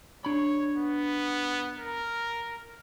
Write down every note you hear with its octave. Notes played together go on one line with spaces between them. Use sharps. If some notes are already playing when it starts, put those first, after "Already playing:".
D4 C#5 B5
B3
A#4